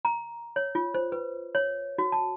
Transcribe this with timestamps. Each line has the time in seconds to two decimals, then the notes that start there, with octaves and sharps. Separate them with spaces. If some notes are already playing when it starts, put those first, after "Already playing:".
0.05 A#5
0.56 C#5
0.75 F4
0.94 C5
1.12 B4
1.55 C#5
1.98 F#4
2.12 A5